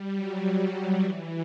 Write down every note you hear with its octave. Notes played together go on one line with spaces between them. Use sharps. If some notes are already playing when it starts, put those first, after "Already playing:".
Already playing: G3
F#3
E3